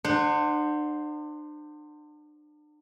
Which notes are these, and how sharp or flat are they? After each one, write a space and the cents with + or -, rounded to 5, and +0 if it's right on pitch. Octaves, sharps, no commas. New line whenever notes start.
D4 +40 C5 +0 F#5 -10